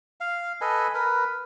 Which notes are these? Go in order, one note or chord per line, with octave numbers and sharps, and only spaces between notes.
F5
A4 B4 D#5 G#5
A#4 B4